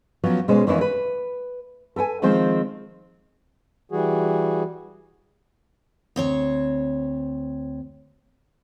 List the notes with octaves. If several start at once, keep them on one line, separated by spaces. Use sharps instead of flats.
F3 F#3 B3 C#4
B2 G#3 C#4 C5
F2 D#3 E3 A#3 C#4 E4
B4
A4 B4 G5 G#5
D#3 F3 G#3 C4 C5
E3 G3 F#4 G#4
D2 C4 C#5